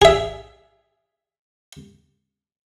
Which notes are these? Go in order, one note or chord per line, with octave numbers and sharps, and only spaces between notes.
G#4 E5